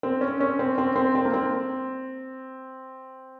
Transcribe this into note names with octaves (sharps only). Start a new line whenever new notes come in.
C4
C#4
C#4
C4
C4
C4
C4
A#3
C4